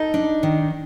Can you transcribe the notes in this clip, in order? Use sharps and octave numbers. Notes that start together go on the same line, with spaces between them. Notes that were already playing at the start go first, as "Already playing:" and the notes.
Already playing: D#4 A4
D4
D#3